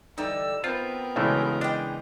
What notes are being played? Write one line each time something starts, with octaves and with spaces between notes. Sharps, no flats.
D3 E3 G3 D#4 E6
B3 C4 F4 A#4
B1 G2 C#3 E3 G#3 A3
D4 D#4 G5